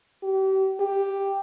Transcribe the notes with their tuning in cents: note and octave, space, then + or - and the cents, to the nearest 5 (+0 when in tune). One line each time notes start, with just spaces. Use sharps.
G4 -35
G4 +5